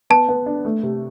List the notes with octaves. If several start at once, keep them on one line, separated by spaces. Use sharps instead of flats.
B3 A5
B3
D4
A3
C3